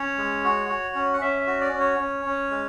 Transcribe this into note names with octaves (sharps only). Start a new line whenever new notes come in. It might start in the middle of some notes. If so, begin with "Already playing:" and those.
Already playing: C#4 C#5
G#3
F#4
F#4
C#4
F#5
C#4 E5
E5
F#4
D5
C#4
C#5
C#4
C#4
G#3